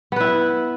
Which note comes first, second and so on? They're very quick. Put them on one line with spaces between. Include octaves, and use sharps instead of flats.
B3 B4 E4